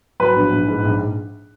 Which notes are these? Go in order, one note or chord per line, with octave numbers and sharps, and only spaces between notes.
F#3 B4
A#1
A#1
G#2
A#1